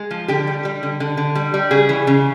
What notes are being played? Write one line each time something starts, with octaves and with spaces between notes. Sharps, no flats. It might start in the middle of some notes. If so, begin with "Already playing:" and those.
Already playing: G#3
F3
D3 G4
G3
G3
D3
D3
D3
G3
G3
C#3 G#4
E3
C#3